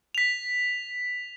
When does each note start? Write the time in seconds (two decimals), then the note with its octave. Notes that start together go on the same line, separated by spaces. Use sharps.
0.15 B6 F7